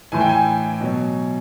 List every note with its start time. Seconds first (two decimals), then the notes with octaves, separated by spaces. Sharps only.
0.12 A2 E3 G#5
0.20 G5
0.29 G#5
0.81 B2 F#3